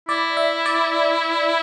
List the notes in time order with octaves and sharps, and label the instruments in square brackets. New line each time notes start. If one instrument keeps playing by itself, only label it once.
[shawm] E4 [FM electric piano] D5
[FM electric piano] E5
D5